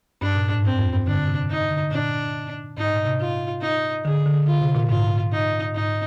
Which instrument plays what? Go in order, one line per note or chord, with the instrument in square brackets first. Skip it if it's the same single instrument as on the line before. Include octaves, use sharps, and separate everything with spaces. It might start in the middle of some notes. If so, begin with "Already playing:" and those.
[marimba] G2 [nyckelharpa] D4
[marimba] A#2
G#2
[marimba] G2 [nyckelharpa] C4
[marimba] F2
G2
[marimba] D3 [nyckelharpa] D4
[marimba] C3
[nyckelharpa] D#4
[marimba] D3
[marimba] A#2 [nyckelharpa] D4
[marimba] G#2 [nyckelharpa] D#4
[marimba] A#2
C3
[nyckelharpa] F4
D#4
[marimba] D3 [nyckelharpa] G#4
[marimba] D3
[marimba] D3 [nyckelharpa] F4
[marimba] C3
A#2
[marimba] G#2 [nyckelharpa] F4
[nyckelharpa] D#4
[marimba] G#2 [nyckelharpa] D#4